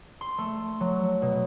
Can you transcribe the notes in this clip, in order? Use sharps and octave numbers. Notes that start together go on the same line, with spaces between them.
C6
A3
F#3
B2